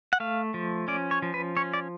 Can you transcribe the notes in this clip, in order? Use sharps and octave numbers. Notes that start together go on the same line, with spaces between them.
F#5
A3 F5
F3
C#4 D5
C#5
F3
B4
C#4 C#5
D5